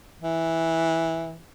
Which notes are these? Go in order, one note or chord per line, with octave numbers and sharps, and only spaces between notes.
E3